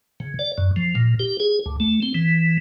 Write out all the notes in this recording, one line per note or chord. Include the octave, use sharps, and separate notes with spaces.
C#3
D5
F#2
F3
A#2
G4
G#4
D2
A3
C4
E3